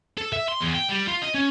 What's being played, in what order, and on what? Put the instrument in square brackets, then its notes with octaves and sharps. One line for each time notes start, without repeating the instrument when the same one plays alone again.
[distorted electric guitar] A4
E5
C6
E2
G5
G3
F4
D#5
C#4